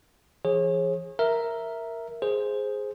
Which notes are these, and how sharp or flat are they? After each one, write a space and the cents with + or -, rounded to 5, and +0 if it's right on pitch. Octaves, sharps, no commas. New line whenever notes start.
E3 +40 G#4 +0 C#5 -40
A#4 +0 E5 +0
G#4 +0 C5 +0